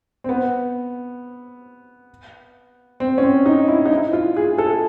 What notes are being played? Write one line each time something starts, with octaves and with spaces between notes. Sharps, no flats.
C4
B3
C4
C#4
C4
D#4
E4
D#4
E4
F4
G#4
A4